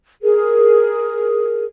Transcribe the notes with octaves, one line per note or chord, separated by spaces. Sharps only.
G#4 A#4